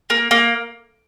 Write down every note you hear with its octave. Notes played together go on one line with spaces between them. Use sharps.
A#3
A#3